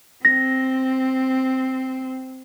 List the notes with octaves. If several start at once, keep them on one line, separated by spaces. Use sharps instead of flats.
C4 A#6